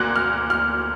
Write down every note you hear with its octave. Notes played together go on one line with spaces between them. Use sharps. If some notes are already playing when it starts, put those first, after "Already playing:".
Already playing: D2 A#3 F#6
F6
F6